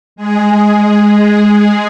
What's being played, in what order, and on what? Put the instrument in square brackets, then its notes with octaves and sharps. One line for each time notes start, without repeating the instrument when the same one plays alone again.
[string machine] G#3 G#4